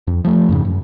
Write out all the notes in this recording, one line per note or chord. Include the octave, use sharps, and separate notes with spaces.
F2
F3 A3
F2 G#2 C#3
F#2